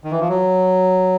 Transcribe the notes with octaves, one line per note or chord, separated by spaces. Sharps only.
D#3
E3
F3
F#3